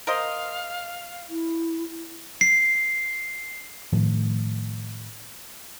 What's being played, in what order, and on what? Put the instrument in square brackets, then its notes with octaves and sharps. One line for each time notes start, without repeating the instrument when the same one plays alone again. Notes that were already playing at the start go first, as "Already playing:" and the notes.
[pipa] A#4 C5 D#5 [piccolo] F5
[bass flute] E4
[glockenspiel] C7
[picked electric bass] A2 D#3 F3 A3